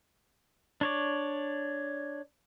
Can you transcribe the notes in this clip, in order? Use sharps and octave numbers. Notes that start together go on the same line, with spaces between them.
D4 C#5 D5